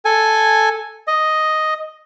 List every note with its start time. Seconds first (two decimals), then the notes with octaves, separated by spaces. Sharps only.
0.05 A4 G#5
1.07 D#5